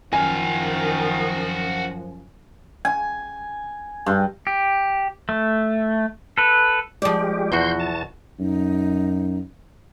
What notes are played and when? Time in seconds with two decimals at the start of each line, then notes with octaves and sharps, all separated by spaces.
0.13 F#2 D#3 F3 F#4 F5 G#5
2.85 G#5
4.06 G2
4.47 G4
5.29 A3
6.38 A4 B4
7.02 F3 G#3 G4 D5
7.52 E2 B2 F#4 C6 G6
7.79 A5
8.39 F#2 D#4